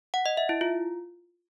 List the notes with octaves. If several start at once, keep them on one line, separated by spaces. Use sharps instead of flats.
F#5
D#5
E5
E4
F4